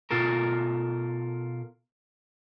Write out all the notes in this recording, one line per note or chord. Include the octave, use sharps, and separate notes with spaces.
B2 F4 A4 A#4